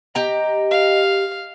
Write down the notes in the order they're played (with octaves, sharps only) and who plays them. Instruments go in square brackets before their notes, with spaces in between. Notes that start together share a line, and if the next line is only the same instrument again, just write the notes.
[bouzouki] G4 G5 A#5 [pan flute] D#5
[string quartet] F5